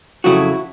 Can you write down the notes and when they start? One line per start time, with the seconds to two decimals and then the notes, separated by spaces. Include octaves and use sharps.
0.24 F2 C#3 F#3 A3 E4 F#4